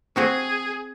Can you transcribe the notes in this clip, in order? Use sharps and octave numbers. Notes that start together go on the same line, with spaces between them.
C4 F#4 G#4 C5